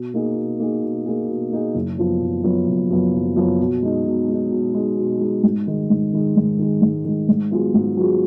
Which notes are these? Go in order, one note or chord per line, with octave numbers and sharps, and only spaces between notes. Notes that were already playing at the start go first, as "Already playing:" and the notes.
Already playing: B2
A#3 D#4 G#4
B2
A#3 D#4 G#4
B2
A#3 D#4 G#4
B2
A#3 D#4 G#4
F#1
F#2 F3 B3
F#1
F#2 F3 B3
F#1
F#2 F3 B3
F#1
F#2 F3 B3
B2
G#3 D#4
B2
G#3 D#4
B2
G#3 D#4
B2
G#3 D#4
G#2
D#3 G#3
G#2
D#3 G#3
G#2
D#3 G#3
G#2
D#3 G#3
G#2
F#3 B3 F4 G#4
G#2
F#3 B3 F4 G#4